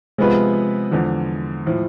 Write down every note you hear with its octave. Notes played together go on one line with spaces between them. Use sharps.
C3 F3 G#3 B3 F4 B4
E2 D3 F3
A2 F3